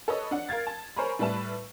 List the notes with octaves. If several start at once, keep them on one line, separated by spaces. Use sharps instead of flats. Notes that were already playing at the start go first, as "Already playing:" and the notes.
A4 B4 C#5 D#5
D4 F#5
A#4 F5 G#6 A6
A5
A#4 C5 C#5 G#5 A#5 B5
A2 G3 B4 E5 A5 E7